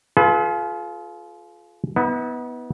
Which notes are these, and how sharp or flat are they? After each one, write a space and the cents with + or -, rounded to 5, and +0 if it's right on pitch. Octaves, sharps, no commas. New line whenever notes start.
F4 +0 G#4 +45 B4 +0
B3 +0 E4 -45